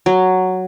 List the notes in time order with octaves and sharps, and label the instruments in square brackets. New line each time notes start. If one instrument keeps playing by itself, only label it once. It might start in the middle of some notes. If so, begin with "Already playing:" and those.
[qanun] F#3